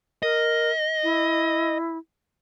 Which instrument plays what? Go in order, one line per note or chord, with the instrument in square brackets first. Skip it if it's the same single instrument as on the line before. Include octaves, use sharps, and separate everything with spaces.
[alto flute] A#4 [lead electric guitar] D#5
[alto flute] E4